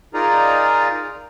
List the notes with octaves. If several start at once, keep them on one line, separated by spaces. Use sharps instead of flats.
D#4 F4 G#4 A#4 D5 A#5